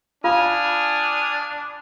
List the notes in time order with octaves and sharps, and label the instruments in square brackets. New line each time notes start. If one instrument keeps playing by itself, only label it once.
[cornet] D4 [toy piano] F4 [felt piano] F5 B5 [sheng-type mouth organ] G#5 D#6 F6